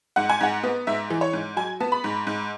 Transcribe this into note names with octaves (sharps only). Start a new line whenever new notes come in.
G#2 F#5
G#5
G#2 F#5
B3
G#2 E5
E3
C#5
G#2
F#3 G#5
B3 A5
B5
G#2
G#2